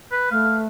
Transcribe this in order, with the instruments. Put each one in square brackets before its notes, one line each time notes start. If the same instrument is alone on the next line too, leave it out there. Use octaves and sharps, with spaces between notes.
[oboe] B4
[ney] A3 [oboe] F5